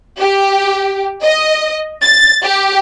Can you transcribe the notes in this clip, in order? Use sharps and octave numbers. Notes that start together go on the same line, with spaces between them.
G4
D#5
A6
G4